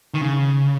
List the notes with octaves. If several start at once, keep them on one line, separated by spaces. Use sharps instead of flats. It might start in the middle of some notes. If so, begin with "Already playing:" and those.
D#3
C#3